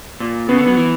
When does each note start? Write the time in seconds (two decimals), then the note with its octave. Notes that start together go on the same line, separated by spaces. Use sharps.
0.20 A#2
0.48 C#3 B3
0.58 D3
0.67 F#3
0.77 E3